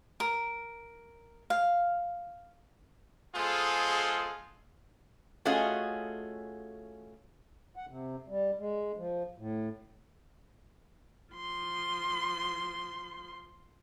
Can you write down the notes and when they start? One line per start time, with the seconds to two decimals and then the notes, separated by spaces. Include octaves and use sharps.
0.20 A#4
1.50 F5
3.35 G#3 B3 F4 G#4 A4 C5
5.45 A3 C#4 F4 F#4 G#4 D#5
7.76 F#5
7.89 C3
8.28 G3
8.59 G#3
8.97 F3
9.38 A2
11.35 F3 C6